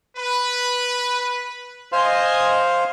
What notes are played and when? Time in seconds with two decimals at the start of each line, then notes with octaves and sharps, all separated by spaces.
0.17 B4
1.92 C5 D#5 F5 G#5 C6